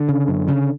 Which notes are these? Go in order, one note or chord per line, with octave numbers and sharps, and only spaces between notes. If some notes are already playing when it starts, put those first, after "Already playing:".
Already playing: D3
C#3
F#2
C#3